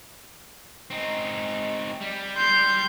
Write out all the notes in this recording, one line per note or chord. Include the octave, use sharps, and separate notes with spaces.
C4 D#4
G3
C6 G6